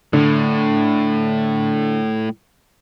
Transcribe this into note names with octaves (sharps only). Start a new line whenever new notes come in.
A2 D3